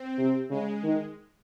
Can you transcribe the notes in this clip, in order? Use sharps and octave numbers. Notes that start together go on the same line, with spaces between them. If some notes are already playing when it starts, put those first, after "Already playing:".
Already playing: C4
C3
C#3 G#3
D#3